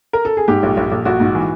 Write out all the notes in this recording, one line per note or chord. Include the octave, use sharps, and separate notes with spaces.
A#4
A4
G#4
G#2 G4
A#1
A#1
A#1
A#1 F#4
G#2
E3